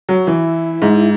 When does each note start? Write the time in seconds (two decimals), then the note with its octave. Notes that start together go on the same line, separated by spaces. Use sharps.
0.09 F#3
0.27 E3 E4
0.82 G#2